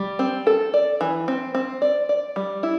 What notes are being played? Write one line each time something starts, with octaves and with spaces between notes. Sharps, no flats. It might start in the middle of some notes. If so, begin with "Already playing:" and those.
Already playing: G3
C4
A4
D5
E3
C4
C4
D5
D5
G3
E4